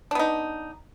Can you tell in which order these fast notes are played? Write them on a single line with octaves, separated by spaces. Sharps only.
D4 B3 D#4